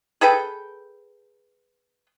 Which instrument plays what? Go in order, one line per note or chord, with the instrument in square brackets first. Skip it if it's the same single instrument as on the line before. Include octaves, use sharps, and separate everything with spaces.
[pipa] G#4 A4 B4 G5